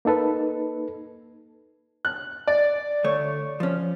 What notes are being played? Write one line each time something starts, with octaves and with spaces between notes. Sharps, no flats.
A#3 D#4 A4 B4
F#6
D5
D2 A3 C#5
F3 C#4